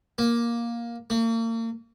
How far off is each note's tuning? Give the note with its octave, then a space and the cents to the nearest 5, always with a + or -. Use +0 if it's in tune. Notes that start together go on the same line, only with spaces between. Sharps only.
A#3 +10
A#3 -40